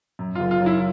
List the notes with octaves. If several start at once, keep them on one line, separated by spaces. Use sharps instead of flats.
F#2
F#1 F4
F4
F#3
E4